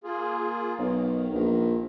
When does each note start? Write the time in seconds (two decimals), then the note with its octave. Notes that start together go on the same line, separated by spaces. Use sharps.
0.04 A#3 F4 G#4
0.78 B1 D#3
1.34 A#1